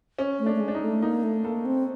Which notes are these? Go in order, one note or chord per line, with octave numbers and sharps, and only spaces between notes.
C#4
A3
D4
A3
G#3
D4
D#4
A3
A#3 D#4
A3
A#3 A4
C4